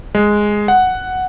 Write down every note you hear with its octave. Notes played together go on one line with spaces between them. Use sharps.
G#3
F#5